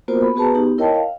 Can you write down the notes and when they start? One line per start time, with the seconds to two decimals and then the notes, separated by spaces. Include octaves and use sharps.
0.08 A#3 B3 F4 F#4 A#4 C5
0.21 B5
0.36 B3 F#4 G#4 B4 A5 A#5
0.55 B3 D#4 G4
0.78 E4 A#4 C#5 D#5 G5 A5
0.94 F5